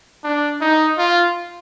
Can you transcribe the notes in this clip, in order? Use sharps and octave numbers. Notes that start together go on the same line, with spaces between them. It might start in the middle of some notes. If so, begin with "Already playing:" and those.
D4
D#4
F4